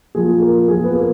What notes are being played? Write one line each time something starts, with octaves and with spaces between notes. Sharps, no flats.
A#2 F3 G#4
A#4
A#2 F3 G#4
B3
A#3